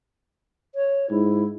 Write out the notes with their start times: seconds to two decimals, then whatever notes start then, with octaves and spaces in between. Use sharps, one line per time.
0.75 C#5
1.10 G#2 E4